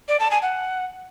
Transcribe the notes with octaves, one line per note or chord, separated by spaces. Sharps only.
D5
A5
G#5
F#5